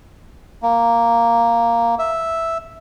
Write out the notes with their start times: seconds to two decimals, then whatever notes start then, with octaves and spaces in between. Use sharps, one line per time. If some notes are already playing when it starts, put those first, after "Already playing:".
0.63 A#3
1.99 E5